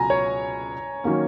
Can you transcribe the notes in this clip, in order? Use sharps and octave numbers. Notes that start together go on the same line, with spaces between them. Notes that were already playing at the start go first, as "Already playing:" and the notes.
Already playing: C#2 B2 F#3 G#5 A#5
C#5
D#3 F#3 A#3 C#4